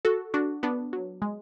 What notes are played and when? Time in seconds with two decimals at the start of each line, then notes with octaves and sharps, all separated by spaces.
0.05 F#4 A4
0.34 D4 F#4
0.63 B3 D4
0.93 F#3
1.22 G#3